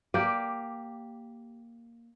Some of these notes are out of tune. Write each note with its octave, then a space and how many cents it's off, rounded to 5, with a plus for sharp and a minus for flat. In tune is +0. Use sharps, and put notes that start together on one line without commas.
A#3 +0 G4 +5 D5 +0